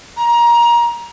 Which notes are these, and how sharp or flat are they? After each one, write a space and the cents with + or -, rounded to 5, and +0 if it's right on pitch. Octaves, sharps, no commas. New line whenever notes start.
A#5 +25